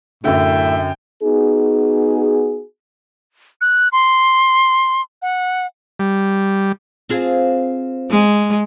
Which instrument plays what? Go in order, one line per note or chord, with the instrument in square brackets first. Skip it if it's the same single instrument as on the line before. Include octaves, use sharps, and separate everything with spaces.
[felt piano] F#2 D3 [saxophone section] A2 E5 [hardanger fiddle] G5
[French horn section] B3 D#4 F#4 G#4
[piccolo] F#6
C6
F#5
[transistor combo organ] G3
[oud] C4 F4 G#4
[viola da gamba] G#3